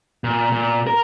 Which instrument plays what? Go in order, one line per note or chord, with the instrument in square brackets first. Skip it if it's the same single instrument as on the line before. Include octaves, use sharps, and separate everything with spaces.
[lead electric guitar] A#2
A#2
A#4